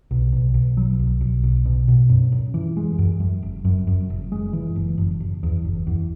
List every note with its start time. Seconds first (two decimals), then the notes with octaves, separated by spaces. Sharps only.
0.11 B1
0.32 B1
0.54 B1
0.77 F#3
0.99 B1
1.21 B1
1.43 B1
1.65 B2
1.88 B2
2.09 F#2
2.32 F#2
2.54 E3
2.77 G#3
2.99 F#2
3.20 F#2
3.43 F#1
3.65 F#2
3.87 F#2
4.10 F#1
4.32 G#3
4.53 E3
4.76 F#1
4.98 F#1
5.20 F#1
5.43 E2
5.65 F#1
5.87 E2